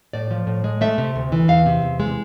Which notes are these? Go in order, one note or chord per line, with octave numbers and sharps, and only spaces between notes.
A2 D5
F3
A2
G#3
A3 E5
C3
D2
E3
E2 F5
C3
E2
G#3